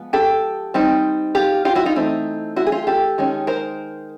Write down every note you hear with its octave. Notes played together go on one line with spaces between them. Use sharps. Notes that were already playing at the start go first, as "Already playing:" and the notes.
Already playing: F3 G#3 B3
G4 A4
G3 C4 D#4
F4 G4
F4 G4
E4 F#4
D#4 F4
E3 A3 C4 D#4
E4 F#4
G#4
F4 G4
G4 A4
D#3 G#3 C#4
A#4 C5